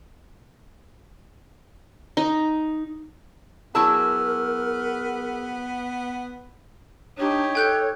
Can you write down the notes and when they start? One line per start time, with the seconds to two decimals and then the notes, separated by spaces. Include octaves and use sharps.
2.17 D#4
3.75 F#3 B3 E4 G#4 A#4 A5 E6
7.18 D4 D#4 G4 C#5
7.55 A4 G5 F#6 G6